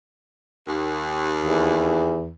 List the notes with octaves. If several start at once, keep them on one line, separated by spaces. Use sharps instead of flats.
D#2
E2